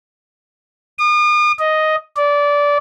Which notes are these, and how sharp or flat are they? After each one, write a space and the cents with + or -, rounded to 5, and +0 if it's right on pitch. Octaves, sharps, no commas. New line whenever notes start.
D#6 -40
D#5 +5
D5 -20